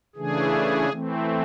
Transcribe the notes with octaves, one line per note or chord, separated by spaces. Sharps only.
C#3 E3 A3 D4 G#4
E3 A3 C4